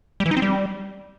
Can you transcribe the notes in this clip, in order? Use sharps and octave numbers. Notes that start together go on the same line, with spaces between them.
G3
E3
D#4
C4
G3